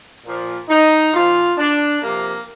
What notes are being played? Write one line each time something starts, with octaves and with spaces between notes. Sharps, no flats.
A#2 F3
D#4
A#2 F3 F4
D4
C3 F3 A#3